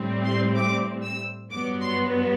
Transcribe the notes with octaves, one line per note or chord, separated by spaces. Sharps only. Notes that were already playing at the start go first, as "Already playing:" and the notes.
Already playing: A2 G3 C4
C6
D6
E6
G2 F#3 B3 D6
C6